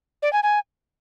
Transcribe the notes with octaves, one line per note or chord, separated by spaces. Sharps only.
D5
G#5
G#5